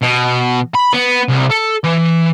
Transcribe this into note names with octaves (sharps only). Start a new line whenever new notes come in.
B2
B5
B3
C2
A4
E3